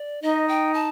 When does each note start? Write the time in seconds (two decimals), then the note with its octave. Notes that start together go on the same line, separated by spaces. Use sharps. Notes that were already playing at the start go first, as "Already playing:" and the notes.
Already playing: D5
0.22 D#4 D#5
0.48 G5
0.74 A5